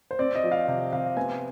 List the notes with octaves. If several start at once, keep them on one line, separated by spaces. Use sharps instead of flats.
C5
C4 D5
D#5
F3
F5
C3
C3 F5
B3 G#5